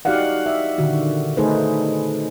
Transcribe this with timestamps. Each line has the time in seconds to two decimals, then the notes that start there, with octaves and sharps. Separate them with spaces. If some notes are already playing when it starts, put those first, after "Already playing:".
0.05 D#4 F#4 G4 D5 F5 F#5
0.46 E5
0.78 A#2 D3 D#3 F#4
1.37 A3 D#4 G#4 A4 B4 C5